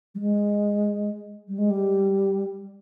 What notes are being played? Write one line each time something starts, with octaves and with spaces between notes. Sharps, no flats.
G3
G#3
G3
G#3
G3